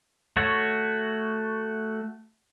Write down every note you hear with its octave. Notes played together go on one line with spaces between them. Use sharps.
A3 F#4 C#5